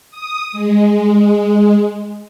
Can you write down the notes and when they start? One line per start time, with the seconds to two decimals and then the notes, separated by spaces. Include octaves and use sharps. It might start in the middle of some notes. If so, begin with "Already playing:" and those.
0.11 D#6
0.52 G#3